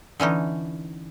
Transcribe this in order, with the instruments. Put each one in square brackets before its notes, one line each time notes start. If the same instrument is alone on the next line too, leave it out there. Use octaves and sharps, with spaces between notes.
[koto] D3 E3 C#4 D#4